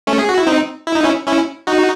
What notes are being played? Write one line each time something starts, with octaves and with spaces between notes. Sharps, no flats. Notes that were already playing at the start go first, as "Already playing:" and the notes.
A3 C#4
G#4
F#4
E4
C4 D#4
E4
D#4
C#4 E4
C#4 E4
D#4 F#4